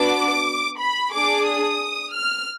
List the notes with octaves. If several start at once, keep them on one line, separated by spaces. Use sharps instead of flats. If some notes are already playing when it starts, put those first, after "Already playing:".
Already playing: B3 D4 F#4 D6
B5
G#4 D6
D4
D#6
F6